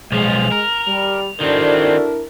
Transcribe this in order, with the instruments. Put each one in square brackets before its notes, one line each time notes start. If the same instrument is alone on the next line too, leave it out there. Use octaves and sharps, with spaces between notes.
[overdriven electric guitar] B1 F3 [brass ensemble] G#3 [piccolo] F7
[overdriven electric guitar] A#4
[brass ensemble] G3
[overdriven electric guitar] D#3 C4 [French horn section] D4 E4 A#4 [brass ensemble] F#4 A4 D5